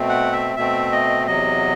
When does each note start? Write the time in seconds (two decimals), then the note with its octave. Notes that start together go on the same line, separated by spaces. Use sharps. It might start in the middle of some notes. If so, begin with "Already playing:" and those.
Already playing: B2 A3 C4
0.09 F#5
0.32 E5
0.56 B2 A3 C4 E5
0.92 D#5
1.27 E2 C3 F#3 D#5